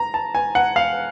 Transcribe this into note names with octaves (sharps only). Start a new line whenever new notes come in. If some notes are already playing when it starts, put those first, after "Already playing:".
Already playing: A#5
A5
G#5
F#5
F5